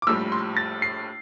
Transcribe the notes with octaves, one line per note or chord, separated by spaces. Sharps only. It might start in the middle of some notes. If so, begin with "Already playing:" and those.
D6
A#1 A2 G3 E6
C6
A6
C7